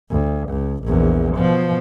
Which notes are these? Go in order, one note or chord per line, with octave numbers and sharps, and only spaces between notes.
D2
C#2
A#1 E2
B2 F3